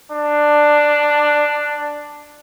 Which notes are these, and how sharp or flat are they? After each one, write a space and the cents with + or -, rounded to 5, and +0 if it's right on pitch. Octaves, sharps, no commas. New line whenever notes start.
D4 +10